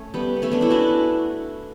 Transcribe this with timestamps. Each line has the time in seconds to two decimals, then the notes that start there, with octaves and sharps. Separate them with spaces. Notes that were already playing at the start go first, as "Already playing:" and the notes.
Already playing: A3 C#4
0.14 G3 B3
0.37 B3
0.42 A3 C#4
0.52 B3 D4
0.61 C#4 E4
0.70 D4 F#4